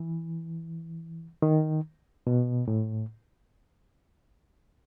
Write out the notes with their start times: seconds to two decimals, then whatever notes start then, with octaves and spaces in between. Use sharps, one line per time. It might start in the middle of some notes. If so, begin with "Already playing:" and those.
Already playing: E3
1.42 D#3
2.27 B2
2.68 A2